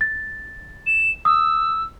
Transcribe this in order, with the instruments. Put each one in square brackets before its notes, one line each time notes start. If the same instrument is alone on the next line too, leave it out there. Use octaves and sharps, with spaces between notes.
[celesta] A6
[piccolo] E7
[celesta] D#6 [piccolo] E6